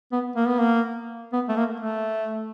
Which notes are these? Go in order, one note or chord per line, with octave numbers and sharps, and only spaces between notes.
B3
A#3
B3
A#3
B3
A3
A#3
A3